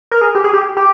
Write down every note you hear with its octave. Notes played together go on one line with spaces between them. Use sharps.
A#4
G#4
G4
G#4
G4
G4